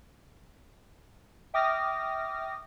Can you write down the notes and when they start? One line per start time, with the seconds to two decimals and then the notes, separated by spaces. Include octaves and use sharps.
1.54 E5 G5 D6 D#6 F6 A#6